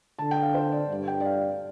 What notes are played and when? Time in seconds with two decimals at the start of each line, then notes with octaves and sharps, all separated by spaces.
0.19 D3 A5
0.31 G5
0.42 F5
0.54 C5
0.72 D5
0.90 G2
1.08 G5
1.20 D5
1.26 F5